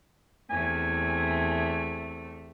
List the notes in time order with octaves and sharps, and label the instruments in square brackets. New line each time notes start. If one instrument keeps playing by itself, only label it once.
[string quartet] E2 C3 A3 [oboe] G#5